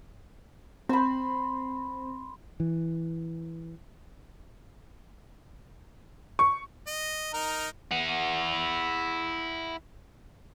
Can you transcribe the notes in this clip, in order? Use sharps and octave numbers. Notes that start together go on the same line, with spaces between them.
C4 B5 C6
E3
C#6
D#5
D#4 A#4
E4 F#5